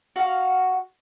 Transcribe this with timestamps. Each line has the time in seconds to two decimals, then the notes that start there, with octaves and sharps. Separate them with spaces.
0.16 F#4 F5